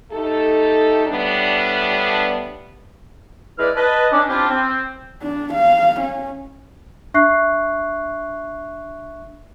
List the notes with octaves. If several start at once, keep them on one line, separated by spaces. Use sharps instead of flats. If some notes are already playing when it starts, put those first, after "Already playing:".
A3 D#4 G4 A4
A2 G3 B3 D4
G#3 E4 B4 D5 E5 F6
B4 D#5 A5
C#4 D4 D5
C4 D4 E4 F4 G4
C4
D4
F5
C#4
D4 E5 C#6 F#6 C7